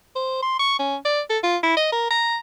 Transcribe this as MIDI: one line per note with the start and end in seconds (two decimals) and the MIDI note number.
0.16 0.40 72
0.42 0.59 84
0.59 0.75 85
0.79 0.96 61
1.05 1.21 74
1.30 1.38 69
1.43 1.57 65
1.63 1.75 64
1.77 1.92 75
1.92 2.07 70
2.11 2.37 82